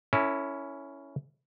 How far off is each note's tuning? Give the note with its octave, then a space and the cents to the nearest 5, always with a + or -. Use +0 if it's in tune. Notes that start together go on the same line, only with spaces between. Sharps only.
C#4 +10 E4 +0 A#4 -45